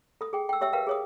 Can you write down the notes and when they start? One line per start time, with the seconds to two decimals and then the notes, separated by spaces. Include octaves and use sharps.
0.21 A4 D#6
0.33 G#4 G5
0.49 G5 E6
0.61 G4 C#5 E5 G5 E6
0.73 A#4 B4 F5 G5
0.87 G#4 C#5 D#6